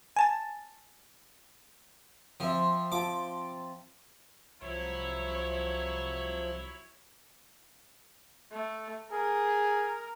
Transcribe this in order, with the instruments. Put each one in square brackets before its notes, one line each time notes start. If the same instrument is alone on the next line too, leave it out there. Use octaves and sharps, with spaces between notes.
[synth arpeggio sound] G#5 A5 A6
[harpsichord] F3 [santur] C4 E5
[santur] F3 G5 A5 [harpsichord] D6
[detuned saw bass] C2 [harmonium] F3 [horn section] F#3 E4 [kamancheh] C#5
[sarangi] A3
[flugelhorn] G#4 [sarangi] A#4